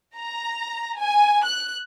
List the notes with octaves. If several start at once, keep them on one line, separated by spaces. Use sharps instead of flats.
A#5
G#5
F#6